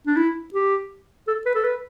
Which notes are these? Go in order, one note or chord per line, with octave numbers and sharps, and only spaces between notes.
D4
E4
G4
A4
B4
A4
B4